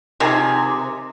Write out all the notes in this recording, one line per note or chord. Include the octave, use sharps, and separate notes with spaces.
C3 D#3 F3 G#4